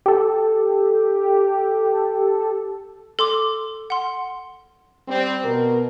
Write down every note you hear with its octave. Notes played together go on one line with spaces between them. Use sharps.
G4 A4
A4 C6 D6
F#5 C6
G3 C4
B2 A#4